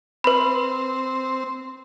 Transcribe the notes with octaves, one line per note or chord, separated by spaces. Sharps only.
C4 B4 B5